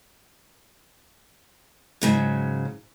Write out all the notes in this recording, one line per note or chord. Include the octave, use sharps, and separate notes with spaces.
G#2 C#3 F#3